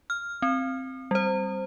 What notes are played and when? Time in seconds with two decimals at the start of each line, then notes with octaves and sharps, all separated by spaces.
0.10 F6
0.42 C4
1.11 G3 C5